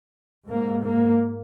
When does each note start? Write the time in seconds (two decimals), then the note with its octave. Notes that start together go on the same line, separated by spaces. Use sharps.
0.48 G#2 A#3
0.84 A#3